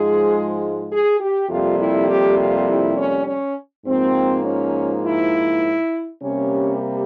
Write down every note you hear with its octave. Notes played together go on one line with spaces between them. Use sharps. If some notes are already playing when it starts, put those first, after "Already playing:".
Already playing: G#2 F3 G#3 G#4
G#4
G4
F2 C3 G3 A#3 F4
E4
G4
F4
E4
C#4
C#4
G#2 F3 A#3 C4
C#4
E4
C3 G3 A#3 C#4